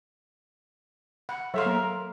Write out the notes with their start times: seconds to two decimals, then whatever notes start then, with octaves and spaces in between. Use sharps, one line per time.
1.29 F#5 B5
1.54 F#3 A4 E5 F5 C6
1.66 A#3 A#4